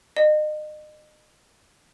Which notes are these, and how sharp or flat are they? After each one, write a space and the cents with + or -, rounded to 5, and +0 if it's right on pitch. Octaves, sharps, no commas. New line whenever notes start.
D#5 -35